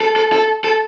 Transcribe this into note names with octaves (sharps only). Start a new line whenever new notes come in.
A4
A4
A4
A4